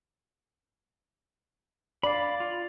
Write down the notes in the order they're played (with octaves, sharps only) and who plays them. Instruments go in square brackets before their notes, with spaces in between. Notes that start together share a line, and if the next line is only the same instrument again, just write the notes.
[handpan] D5 [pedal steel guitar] F5 B5
[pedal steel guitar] F4